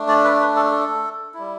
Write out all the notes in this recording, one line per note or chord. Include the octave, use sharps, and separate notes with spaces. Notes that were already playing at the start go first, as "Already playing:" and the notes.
Already playing: A3 D4
D5
B4
B4
A4
A4
G3 E4